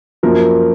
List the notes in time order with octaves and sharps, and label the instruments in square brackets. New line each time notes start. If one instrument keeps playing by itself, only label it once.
[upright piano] F#2 F3 A#3 A#4